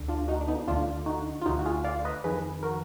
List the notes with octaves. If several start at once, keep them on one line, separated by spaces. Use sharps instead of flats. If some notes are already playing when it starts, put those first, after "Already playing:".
Already playing: D2 D3
D4 F4
D#4 F#4
D4
B3 D#4
D2 D3 D4 F4
D#4 F#4
F4
D2 D3 D#4 F#4
F#4
F4 G#4
D5 F5
B4 D#5
F2 D#3 G#4 B4
F#4 A#4